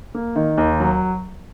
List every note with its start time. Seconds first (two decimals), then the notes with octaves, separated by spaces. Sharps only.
0.15 A#3
0.36 D#3
0.58 D#2
0.80 F#3